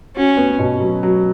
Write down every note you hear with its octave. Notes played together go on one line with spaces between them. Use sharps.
C#4 F#4
B3
B2
F#3
F#3